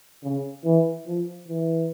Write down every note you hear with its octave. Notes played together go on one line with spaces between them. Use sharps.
C#3
E3
F3
E3